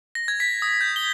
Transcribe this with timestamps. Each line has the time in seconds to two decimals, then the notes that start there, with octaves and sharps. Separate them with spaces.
0.15 A#6
0.28 G#6
0.40 B6
0.62 D#6
0.81 G6
0.96 G7